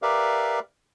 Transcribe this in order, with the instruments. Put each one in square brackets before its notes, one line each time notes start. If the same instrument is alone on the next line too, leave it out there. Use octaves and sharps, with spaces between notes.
[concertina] G4 A#4 B4 D5 E5 F5